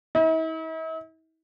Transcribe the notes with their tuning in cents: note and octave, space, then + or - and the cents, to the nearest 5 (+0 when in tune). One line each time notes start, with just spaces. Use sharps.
E4 -45